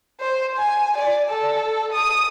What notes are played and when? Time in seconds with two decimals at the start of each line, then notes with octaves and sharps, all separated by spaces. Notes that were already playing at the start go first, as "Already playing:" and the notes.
0.20 C5
0.57 G#5
0.97 D5
1.29 A4
1.92 D#6